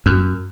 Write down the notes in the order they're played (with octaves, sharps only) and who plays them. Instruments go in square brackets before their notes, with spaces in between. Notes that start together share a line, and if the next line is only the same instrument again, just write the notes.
[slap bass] F#2